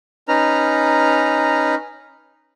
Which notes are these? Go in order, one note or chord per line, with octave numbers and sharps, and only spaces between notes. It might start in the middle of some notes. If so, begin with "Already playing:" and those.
C#4 D#4 B4 A#5 F6